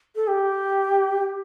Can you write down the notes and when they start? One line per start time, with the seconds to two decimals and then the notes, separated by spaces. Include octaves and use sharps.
0.16 A4
0.28 G4